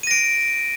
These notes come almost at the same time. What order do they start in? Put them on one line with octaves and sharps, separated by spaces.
D#7 A#6 D7